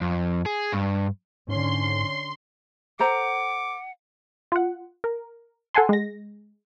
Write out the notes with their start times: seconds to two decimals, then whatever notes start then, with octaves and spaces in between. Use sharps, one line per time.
0.01 F2
0.46 G#4
0.72 G2
1.48 G#2 D3 C#4 C6
2.99 A4 C5 F#5 A#5 D6
4.52 F4 F#5
5.04 A#4
5.75 A4 F#5 G#5 A5 C6
5.89 G#3 A#6